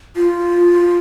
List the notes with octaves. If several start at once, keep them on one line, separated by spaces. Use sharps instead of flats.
F4